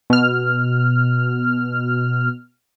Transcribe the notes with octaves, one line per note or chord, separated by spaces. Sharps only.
B2 F6